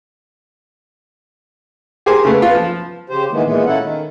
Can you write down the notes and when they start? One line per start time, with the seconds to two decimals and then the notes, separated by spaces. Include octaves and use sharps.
2.06 G4 G#4 A#4 C5 G#5
2.25 C#3 A3 B3
2.42 B3 F4
2.55 F3
3.10 C#3 G4 C5
3.31 D#3 E3 G#3 A#3 B3
3.43 A#2 E3 G#3 B3
3.66 A#3 C#4 E4 A4 F#5
3.82 D#3